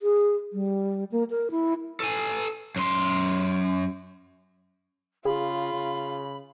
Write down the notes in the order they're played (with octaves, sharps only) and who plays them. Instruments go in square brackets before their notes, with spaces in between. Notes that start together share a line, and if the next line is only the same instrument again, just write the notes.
[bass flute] G#4
G3
A#3
A#4
E4
[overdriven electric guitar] A4 G#5
F#2 C6
[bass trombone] C#3 [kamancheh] F4 [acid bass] G#4 [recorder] B5
[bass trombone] C#3